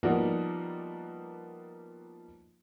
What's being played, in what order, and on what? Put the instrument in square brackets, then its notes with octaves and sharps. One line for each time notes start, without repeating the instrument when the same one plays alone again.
[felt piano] F3 G3 A#3 B3 D#4 F#4